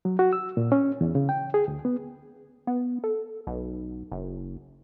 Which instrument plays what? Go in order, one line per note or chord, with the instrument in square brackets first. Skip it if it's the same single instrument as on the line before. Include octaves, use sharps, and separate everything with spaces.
[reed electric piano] F#3
F#4
E6
A#2
C#4
E2
C#3
G5
G#4
D2
B3
[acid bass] B3
A4
B1
F#1